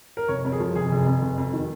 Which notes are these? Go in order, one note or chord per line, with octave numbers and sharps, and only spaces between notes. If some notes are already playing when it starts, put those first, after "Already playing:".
A#4
F1 C#5
F2
G#4
F3
F1 G#4
F1
F2
F1
F2
D#3